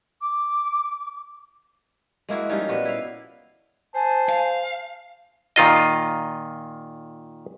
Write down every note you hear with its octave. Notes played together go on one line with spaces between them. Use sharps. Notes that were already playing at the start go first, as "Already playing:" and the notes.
D6
G#3 A#3 E4 F#4
F3 G3 C#4 D#4
A#2 B3 F#4
E4 F5
C5 G#5 A5
F5
A#2 D#3 F4 D#5